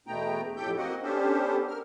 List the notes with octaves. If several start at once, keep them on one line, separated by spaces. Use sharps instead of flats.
E2 B2 A3 B3 G5 A#5
F2 A2 G4 A4 G5 G6
A#3 C4 F#4 D#5 F#5
B3 C#4 D4 G4 A4 C5
A#4 F6